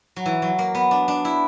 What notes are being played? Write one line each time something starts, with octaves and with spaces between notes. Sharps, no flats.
F#3
E3
F#3
A#3
B3
D4
D4
E4